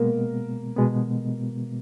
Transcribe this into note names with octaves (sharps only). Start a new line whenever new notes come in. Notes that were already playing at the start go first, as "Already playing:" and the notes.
Already playing: B2 G#3 A#3 B3 A#4
B2 G#3 B3